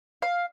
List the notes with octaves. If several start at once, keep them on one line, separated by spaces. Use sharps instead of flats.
F5